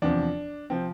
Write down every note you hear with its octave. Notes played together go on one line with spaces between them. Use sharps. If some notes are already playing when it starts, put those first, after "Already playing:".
E2 C3 F3 D4
C3 F3 C4